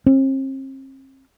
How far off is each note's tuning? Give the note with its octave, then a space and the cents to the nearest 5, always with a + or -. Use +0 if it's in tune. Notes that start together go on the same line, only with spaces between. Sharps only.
C4 +40